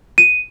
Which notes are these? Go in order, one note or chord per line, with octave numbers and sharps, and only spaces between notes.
D#7